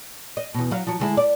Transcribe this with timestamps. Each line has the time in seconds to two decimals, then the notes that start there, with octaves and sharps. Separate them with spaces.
0.37 D#5
0.54 E2 B2
0.71 F#3 F5
0.87 F3 F#3
1.00 D3 G#3 E4
1.17 D5